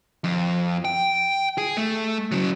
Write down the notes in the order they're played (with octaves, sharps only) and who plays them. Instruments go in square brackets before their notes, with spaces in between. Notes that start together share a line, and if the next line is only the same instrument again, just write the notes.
[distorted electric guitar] F2
G5
G#4
A3
C#3 F#3